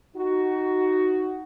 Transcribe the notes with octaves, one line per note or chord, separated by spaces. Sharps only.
D#4 F#4